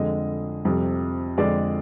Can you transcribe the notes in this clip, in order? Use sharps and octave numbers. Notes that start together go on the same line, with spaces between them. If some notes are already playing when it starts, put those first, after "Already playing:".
Already playing: F2 D3 G#3 D#5
F2 C3 G3
F2 D3 G#3 D5